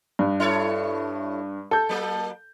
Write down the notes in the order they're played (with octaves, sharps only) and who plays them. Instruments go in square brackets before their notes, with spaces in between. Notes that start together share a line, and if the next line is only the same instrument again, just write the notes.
[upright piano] G2
[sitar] E4 A4 C#5
[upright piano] A4 G6
[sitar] F#3 A#3